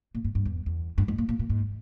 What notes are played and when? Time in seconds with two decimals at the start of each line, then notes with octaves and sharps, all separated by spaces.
0.15 A#2
0.25 G#2
0.35 G2
0.45 E2
0.66 E2
0.98 G2
1.08 G#2
1.18 A#2
1.29 A#2
1.39 A#2
1.50 G#2